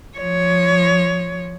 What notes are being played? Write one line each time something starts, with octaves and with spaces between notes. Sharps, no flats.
F3 C#5